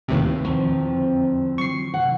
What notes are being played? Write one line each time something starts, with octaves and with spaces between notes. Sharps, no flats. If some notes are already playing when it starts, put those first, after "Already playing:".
D#2 A2 C3 D#4 F4 B4
E2 B2 D#3 F3 C4 C#6
F2 D3
D3 F#3 C#6 C7
C3 E3 F#5